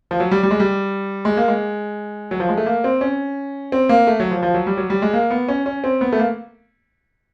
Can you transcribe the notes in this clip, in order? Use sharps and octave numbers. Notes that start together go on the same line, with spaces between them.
F3
F#3
G3
G3
G#3
G3
G#3
A#3
G#3
F#3
F3
G#3
A3
A#3
C4
C#4
C4
A#3
A3
F#3
F3
F3
F#3
G3
F#3
G3
G#3
A#3
B3
C#4
C#4
C4
B3
A3
A#3